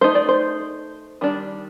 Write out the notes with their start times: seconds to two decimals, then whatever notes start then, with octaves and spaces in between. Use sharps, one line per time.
0.01 A3 D#4 C5
0.15 D5
0.29 C5
1.21 D#3 G3 D4